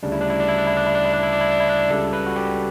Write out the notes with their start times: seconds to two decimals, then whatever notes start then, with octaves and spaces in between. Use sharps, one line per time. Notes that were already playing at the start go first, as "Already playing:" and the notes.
0.03 D2 C#3 G3 D4
0.12 E4
0.21 D4
0.30 E4
0.40 D4
0.48 E4
0.58 D4
0.67 E4
0.77 D4
0.86 E4
0.95 D4
1.05 E4
1.14 D4
1.23 E4
1.33 D4
1.41 E4
1.51 D4
1.60 E4
1.69 D4
1.90 C#2 C#3 G3 A4
2.13 B4
2.26 F#4
2.36 G4